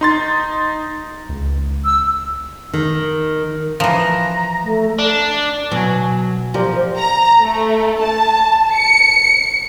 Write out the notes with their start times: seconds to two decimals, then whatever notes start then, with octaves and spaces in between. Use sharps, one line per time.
0.01 D#4 C6 A6
1.29 C#2
1.84 E6
2.73 D#3
3.80 E3 F3 A#5
4.63 A3
4.99 D4
5.72 B2 F#3 G#5
6.54 F3 G4 A#4 D5
6.98 A#5
7.42 A3
8.01 A5
8.74 C#7